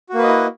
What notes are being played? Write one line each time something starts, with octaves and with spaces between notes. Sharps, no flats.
A#3 E4 F#4 B4 D#5